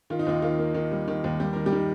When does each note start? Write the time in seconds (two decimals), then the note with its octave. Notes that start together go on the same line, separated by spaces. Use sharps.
0.10 D#3 F4
0.19 D#4
0.27 D#2 F4
0.42 D#3 F4
0.59 A#3
0.74 D#3
0.91 G3
1.08 D#3
1.24 D#2
1.40 G3 G4
1.53 D#3 A#4
1.66 G3 G4
1.72 D#3